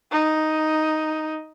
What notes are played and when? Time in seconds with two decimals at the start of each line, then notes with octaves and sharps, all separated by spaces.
0.11 D#4